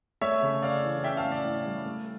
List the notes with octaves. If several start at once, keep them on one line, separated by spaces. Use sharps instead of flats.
A3 C#5 E5
C#3
C#3 D5 F5
E3
C#4 E5 G5
F5 A5
A2
D5
A2
G3
A3